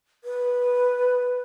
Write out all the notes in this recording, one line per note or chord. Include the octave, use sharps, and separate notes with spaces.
B4